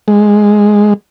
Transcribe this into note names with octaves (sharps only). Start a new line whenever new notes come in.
G#3